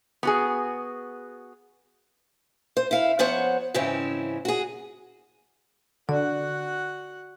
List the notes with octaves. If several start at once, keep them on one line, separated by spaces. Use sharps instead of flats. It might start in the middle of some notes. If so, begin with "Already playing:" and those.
B3 F#4 G#4
C5
E4 F5
F3 B3 C5 C#5 F#5
G#2 C#3 E3 C4 C#4 E4
F#4 G#4
D3 F#4 D5 F#5